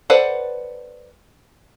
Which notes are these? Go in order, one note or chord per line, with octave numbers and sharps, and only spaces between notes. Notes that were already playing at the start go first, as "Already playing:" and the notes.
A4 B4 C5 D5 F#5